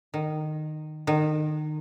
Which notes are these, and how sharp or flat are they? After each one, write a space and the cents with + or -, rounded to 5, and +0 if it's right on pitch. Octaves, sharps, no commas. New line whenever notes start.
D#3 -15
D#3 -25